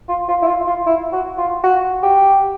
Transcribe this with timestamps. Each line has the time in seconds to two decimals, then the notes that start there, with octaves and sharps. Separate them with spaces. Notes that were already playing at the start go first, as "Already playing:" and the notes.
0.09 F4
0.28 F4
0.42 E4
0.48 F4
0.67 F4
0.86 E4
1.12 F#4
1.38 F4
1.63 F#4
2.03 G4